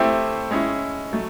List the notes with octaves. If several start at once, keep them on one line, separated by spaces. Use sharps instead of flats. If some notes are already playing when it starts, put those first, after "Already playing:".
Already playing: A3 C4 E4 G4 C5
G#3 C#4 E4
F#3 A3